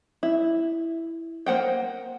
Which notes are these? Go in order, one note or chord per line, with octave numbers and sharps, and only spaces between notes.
E4
A#3 C5 F#5 G5